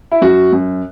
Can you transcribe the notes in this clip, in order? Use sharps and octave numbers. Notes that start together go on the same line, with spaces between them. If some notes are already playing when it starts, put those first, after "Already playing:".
E4
F#2 F#4
F#2